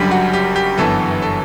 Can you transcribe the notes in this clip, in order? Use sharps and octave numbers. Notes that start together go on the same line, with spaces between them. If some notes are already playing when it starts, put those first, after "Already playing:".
Already playing: F#1 F#2 D3 G3 G4
F#4
G4
G4
G1 F#2 E3 B3 A4
A4